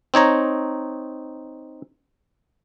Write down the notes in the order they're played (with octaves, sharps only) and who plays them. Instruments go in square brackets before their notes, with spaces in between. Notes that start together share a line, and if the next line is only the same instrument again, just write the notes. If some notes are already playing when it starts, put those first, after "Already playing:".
[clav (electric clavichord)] C4 D#4 C#5 A#5